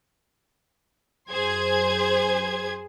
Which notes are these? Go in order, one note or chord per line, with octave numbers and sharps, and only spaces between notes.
F#2 G#4 C5 G#6